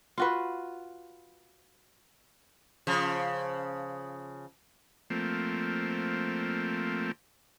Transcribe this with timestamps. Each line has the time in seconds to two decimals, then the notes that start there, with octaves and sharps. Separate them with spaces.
0.18 F4 F#4 B4
2.87 C#3 F3
5.10 F3 A3 A#3 C4